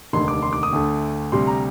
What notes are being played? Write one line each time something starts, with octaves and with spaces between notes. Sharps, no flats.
F1 D#2 D3 C6
D6
C6
D6
D#6
D2 D3 A3
D2 C3 G3 C6
A#5